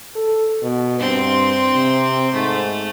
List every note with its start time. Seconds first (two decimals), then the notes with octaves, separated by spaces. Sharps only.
0.15 A4
0.62 B2
1.00 G2 C4 C6
1.75 C3
2.34 G#2 A3